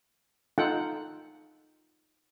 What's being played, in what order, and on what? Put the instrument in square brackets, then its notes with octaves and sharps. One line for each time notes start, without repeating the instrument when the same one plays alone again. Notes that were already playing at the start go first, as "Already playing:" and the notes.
[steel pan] D#4 F4 A4 F#5 G5